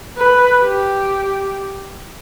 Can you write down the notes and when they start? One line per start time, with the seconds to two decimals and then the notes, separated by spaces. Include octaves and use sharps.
0.17 B4
0.61 G4